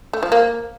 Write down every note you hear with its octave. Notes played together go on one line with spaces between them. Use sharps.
A3
F3
A#3